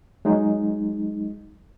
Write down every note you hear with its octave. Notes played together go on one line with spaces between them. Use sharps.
F#3 G#3 D#4